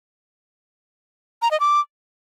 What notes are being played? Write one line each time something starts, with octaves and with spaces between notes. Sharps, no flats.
A#5
D#5
D6